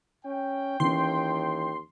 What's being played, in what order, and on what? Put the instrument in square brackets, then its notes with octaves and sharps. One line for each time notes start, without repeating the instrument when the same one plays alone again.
[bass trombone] C#4 [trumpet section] G5
[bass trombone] D#2 [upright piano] E3 C#4 [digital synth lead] C6